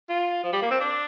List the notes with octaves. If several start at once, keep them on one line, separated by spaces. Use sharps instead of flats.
F4
F3
G3
A#3
C4
D4